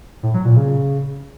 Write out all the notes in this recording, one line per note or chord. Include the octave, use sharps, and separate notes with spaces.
A2
F#3
A#2
C#3